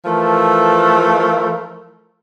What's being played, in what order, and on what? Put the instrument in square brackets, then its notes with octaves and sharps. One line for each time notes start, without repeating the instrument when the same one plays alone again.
[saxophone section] E3 F3 A3 A4 A#4